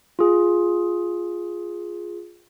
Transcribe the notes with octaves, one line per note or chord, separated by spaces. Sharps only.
F4 G#4